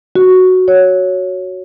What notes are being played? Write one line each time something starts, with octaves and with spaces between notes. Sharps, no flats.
F#4
C#5